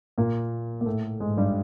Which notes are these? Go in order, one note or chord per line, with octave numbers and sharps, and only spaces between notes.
A#2 A#3
A#3
A2 A3
G#2 G#3
G2 G3